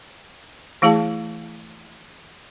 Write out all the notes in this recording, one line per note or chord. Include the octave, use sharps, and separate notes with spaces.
E3 A3 E4 G#4 F5 A5